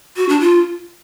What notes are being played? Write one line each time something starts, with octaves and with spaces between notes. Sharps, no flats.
F#4
D4
F4